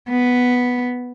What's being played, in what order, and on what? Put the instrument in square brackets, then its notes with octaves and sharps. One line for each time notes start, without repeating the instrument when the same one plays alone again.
[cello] B3